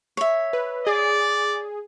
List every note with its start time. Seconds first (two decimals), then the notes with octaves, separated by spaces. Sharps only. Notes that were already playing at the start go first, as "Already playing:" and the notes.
0.17 C#5 E5
0.53 B4
0.87 G#4 D5